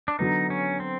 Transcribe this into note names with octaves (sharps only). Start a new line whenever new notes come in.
D4
D3 F#3 B3 D#4
C#4
C4